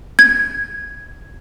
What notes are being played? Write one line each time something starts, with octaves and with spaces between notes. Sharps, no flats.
G#6